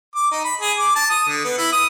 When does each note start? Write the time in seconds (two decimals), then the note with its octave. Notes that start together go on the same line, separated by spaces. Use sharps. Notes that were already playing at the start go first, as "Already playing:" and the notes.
0.15 D6
0.31 D#4
0.44 B5
0.61 G#4
0.78 D6
0.95 A5
1.10 D#6
1.28 D3
1.44 B3
1.58 E4
1.73 D#6